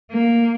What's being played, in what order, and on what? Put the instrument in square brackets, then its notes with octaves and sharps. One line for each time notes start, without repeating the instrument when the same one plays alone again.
[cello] A#3